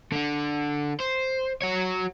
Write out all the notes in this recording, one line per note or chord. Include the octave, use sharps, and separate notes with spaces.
D3 D4
C5
F#4 C#5